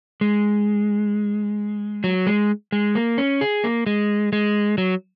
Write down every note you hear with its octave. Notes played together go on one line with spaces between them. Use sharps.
G#3
F#3
G#3
G#3
A#3
C#4
G#4
A#3
G#3
G#3
F#3